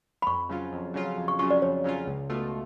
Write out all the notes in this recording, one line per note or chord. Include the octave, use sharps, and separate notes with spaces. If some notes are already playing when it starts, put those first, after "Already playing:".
B5
F2 C#6
C#3 F#3 C#4 F4
F2
C#3 F#3 C#4 F4
F2
C#6
C#3 F#3 C#4 F4 C#6
D5
F2 C#5
C#3 F#3 C#4 F4
C#2
B2 A3 F4